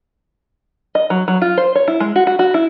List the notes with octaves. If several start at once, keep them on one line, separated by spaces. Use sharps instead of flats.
D#5
F#3
F#3
F4
C5
C#5
E4
G#3
F#4
F#4
F#4
E4